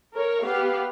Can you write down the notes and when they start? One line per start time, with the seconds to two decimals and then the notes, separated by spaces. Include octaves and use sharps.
0.13 A#4 C#5
0.44 B3 G4 F5